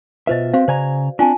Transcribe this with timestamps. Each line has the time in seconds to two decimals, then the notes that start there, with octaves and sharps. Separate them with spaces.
0.27 B2 F4 B4 C5 D#5 E5
0.53 C4 F#4 C5 F5
0.68 C#3 C5 D5 G#5 A#5
1.19 C4 D4 F4 G#5 A5